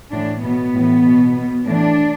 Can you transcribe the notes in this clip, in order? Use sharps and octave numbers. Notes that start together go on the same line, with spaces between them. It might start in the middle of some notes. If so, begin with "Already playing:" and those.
A2 E3 D4
B2 B3
A2 E3
B2
B2
A2 E3 D4